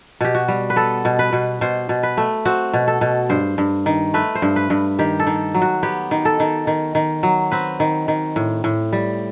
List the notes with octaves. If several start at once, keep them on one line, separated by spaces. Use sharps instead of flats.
B2 G4
F#4
G3
B4
B3 A4
B2
B4
B2
B2 C5
B2
B4
A3
C4 F#4
B2
A4
B2
G2 C5
G2
D#3
A3 B4
C5
G2
B4
G2
D#3 G4
A4
D#3
F#3
F#4
B3 G4
D#3
A4
D#3
D#3
D#3
F#3
C4 B4
D#3
D#3
A2
A2
G3